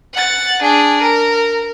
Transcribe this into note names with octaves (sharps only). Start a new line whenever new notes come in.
F#5 A6
D4 G#4
A#4